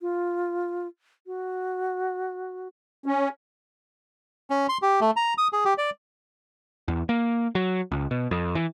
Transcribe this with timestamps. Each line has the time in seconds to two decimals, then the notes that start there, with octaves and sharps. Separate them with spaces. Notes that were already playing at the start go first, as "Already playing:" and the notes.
0.01 F4
1.27 F#4
3.06 C#4
4.50 C#4
4.69 C6
4.82 G4
5.01 A3
5.16 A#5
5.38 D#6
5.53 G#4
5.65 G4
5.78 D5
6.88 E2
7.09 A#3
7.55 F#3
7.92 C#2
8.11 B2
8.31 F2
8.55 E3